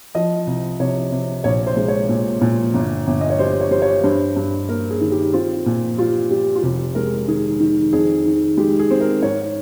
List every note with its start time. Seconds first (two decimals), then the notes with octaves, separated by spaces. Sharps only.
0.15 F3 D#5
0.47 C2
0.80 C3 C#5
1.12 C3
1.44 A#1 C#5
1.67 C5
1.77 G#3
1.88 C#5
2.09 A#2
2.41 A#2
2.74 G1
3.07 G1
3.21 D#5
3.30 C#5
3.39 G3 C5
3.61 C#5
3.71 G3 C5
3.82 C#5
4.04 G2 C5
4.36 G2
4.68 A#3 A#4
4.91 G#4
5.01 D#3
5.11 G4
5.33 C4 F4
5.66 A#2
5.98 G3 F4
6.30 G3 G4
6.56 F4
6.62 F1 G4
6.95 G#3 A#4
7.28 D#3 G#4
7.60 D#3
7.93 F2 G#4
8.25 D#3
8.57 G#3 G4
8.79 G#4
8.91 C4
9.01 A#4
9.22 G#2 C#5